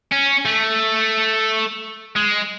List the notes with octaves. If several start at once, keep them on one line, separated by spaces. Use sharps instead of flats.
C#4
A3
G#3